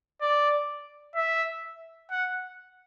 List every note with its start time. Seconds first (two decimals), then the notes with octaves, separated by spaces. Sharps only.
0.22 D5
1.16 E5
2.11 F#5